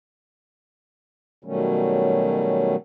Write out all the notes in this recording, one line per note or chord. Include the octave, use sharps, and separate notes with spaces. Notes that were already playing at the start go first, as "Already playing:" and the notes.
B2 D#3 F#3 G3 A3 C#4